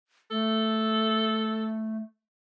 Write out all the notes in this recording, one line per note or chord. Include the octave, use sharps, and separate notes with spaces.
A3 A4